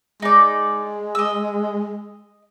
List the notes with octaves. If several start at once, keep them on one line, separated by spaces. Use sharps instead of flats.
G#3 D#4 D5
D#5 E6